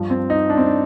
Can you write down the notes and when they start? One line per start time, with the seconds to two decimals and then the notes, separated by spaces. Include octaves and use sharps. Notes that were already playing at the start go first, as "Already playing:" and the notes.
Already playing: G2 F3
0.10 C4
0.30 D#4
0.50 D4
0.58 C4
0.66 D4